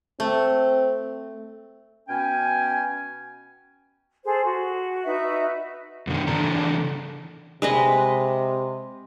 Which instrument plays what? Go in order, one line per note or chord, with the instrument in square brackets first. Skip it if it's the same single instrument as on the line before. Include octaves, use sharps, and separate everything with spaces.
[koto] A3 [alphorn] C4
[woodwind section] B2 C#4 G5 G#5
[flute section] G#4 A4 C5
F#4
D#4 F#4 B4 E5
[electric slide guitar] F#2 B2 D3 D#3
C#3 E3 D4 A4 A#5
[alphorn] C3 [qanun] G#3 B4 D#5